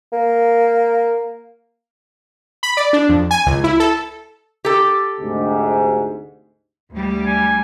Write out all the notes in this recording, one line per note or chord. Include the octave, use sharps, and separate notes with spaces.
A#3
B5
D5
D4
F2
G#5
C#2
E4
A4
G4 A4
D2 G#2 C3
D2 G3
G#5